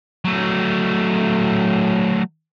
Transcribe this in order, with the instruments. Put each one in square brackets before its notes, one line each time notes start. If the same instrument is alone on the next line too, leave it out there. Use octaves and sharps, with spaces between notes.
[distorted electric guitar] F#3 A3